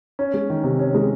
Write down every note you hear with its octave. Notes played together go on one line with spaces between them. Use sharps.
C#4
G#3
D#3
C3
C#4
G#3